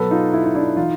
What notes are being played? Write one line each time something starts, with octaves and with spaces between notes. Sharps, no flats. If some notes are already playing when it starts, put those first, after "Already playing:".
Already playing: B2 F#3 A4 B4
D#4 F4
E4
D#4
D4 E4
E3 D#4 F4